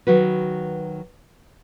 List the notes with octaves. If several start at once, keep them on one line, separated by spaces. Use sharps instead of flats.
D#3 F#3 F#4 B4